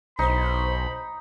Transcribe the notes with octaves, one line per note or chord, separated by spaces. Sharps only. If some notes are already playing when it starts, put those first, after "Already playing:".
B1 D#4 C5 B5